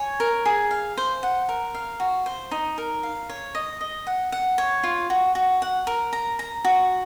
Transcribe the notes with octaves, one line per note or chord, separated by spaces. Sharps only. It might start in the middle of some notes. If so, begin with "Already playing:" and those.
Already playing: C#5 G#5
A#4
G#4
F5
C5
F#5
A#4
F5
F#4
C5
D#4
A#4
F5
C#5
D#5
D#5
F#5
F#5
C#5
F4
F#4
F#4
F#5
A#4
A#5
A#5
F#4